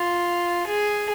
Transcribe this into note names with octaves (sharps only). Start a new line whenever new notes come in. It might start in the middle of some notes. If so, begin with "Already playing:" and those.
Already playing: F4
G#4